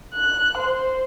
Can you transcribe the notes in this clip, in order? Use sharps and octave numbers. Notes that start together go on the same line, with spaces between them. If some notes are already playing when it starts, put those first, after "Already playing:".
F#6
C5